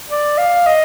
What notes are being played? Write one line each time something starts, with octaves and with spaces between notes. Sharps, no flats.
D5
F5
D#5